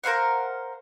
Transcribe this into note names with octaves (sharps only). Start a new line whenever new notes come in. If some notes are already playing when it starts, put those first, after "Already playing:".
A#4 C5 F5 F#5